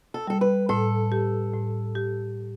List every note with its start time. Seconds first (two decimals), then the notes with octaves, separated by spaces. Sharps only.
0.14 A4
0.27 G3 A4
0.41 B4
0.69 A2 A4
1.12 G4
1.53 A2
1.95 G4